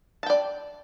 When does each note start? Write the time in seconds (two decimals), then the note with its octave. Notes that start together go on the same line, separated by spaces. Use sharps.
0.23 A5
0.26 G5
0.30 D5